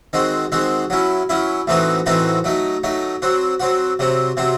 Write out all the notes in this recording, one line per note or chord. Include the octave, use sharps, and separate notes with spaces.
D#3 G#3 C4 F#4
D#3 G#3 C4 F#4
F#3 C#4 E4
F#3 C#4 E4
A2 E3 C4 D#4 F#4
A2 E3 C4 D#4 F#4
F#3 A3 D#4
F#3 A3 D#4
F#3 C4 F#4
F#3 C4 F#4
C3 F#3 C4
C3 F#3 C4